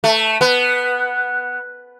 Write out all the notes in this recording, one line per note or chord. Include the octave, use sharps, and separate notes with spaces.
A3
B3